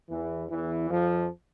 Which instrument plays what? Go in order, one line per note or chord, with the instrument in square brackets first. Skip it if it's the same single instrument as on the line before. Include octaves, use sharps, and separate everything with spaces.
[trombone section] E2 E3
E2 E3
F2 F3